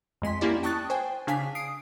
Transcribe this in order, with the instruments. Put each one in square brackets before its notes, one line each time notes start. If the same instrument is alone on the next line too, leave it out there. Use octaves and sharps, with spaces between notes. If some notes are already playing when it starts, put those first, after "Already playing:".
[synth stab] F2 G#3 C6 B6
A#3 C#4 E4 G4 D5
G5 A5 C#6 D#6 F#6 A6
C5 G5 G#5
C#3 D4 F5 G#5 B6
D#6 C7 D7